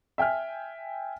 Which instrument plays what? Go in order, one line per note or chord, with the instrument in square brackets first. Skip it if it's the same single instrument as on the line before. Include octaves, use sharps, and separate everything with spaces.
[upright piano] E5 G5 G#5 F6